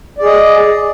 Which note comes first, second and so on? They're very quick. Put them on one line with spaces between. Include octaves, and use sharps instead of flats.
D5 G#4 D#5